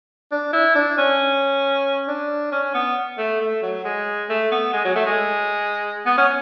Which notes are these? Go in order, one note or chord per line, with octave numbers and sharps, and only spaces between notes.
D4
E4
D4
C#4
D4
C#4
B3
A3
A3
F#3
G#3
A3
B3
G#3
F#3
A3
G#3
B3
C#4